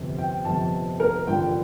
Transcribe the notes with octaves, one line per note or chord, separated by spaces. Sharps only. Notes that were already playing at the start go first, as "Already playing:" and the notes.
Already playing: G1 F2 C3
G5
G1 F2 C3 A5
A#4
A1 G2 D3 F3 G5